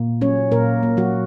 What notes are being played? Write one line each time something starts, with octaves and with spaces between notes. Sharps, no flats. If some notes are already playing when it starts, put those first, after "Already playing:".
Already playing: A#2 A#3
F#3 C#4 C#5
A#2 A#3 A#4
A#3
F#3 F#4